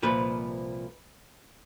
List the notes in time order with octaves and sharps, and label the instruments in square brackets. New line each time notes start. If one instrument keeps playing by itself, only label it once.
[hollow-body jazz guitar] C2 A#2 F3 B4